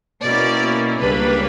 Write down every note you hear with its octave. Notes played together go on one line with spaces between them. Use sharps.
B2 A#3 C#4 E4 D5
C#2 C#3 G3 A#3 D4 B4